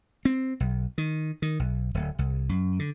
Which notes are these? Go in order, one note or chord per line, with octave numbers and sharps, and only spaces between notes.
C4
B1
D#3
D#3
B1
D1
C2
F#2
D3